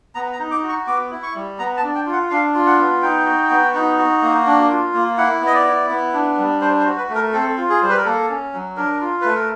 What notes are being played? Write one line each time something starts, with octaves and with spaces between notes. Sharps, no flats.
B3 A#5
A#5
D#4
D6
F#4
C#6
B3 D6
E4
C#6
G3
B3 A#5
A5
D4
G5
F4
F#5
D4 F5
F4
F#5
B3
D#4 G5
F#4
B3
D#4
F#4
A#3
D4
F4
A#3
E4 F#5
B3
D#5
D5
E4
B3
D4
G3
D4 C5
C5
F#4
B4
A3
A#4
C4 A4
F4
G#4
G3 C5
B4
A#4
A#3 A4
C#4
F#3
D4 A#4
F4
A3 B4
A#4